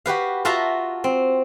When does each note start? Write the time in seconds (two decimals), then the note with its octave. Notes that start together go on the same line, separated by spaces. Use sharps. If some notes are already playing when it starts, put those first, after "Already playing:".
0.06 F#4 G4 B4 F5
0.45 F4 F#4 E5 F5 A5 A#5
1.04 C4